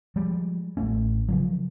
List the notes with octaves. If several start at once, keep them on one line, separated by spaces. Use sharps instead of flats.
F3 G3 G#3
A1 A3 C#4
C#3 F3 F#3